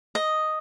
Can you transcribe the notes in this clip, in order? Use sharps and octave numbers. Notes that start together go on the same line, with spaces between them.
D#5